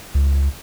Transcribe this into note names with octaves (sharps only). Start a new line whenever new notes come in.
C#2